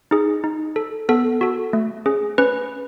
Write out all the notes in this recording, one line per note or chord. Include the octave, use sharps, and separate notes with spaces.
D#4 G#4
D#4
A4
B3 A4
F#4 A4
A3
C#4 G#4
C#4 B4